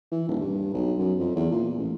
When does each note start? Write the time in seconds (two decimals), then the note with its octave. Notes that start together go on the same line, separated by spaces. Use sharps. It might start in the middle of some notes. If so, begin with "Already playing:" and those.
0.11 E3
0.28 D#1
0.40 G2
0.73 B1
0.98 F#2
1.19 F2
1.36 E2
1.51 A#2
1.78 A1